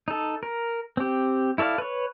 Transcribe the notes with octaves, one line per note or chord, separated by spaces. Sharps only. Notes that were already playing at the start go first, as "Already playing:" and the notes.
D#4 A4
A#4
C4 G4
E4 A4 C#5 D5 F5
B4 C#5